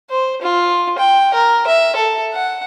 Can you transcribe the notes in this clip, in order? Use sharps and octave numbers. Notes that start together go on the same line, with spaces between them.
C5
F4
G5
A#4
E5
A4
F#5